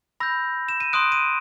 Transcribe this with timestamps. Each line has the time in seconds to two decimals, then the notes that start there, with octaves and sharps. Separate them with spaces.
0.20 B5 E6 G6 A#6
0.68 E7
0.80 D#7
0.93 C6 D#6 F#6 D7
1.12 D#7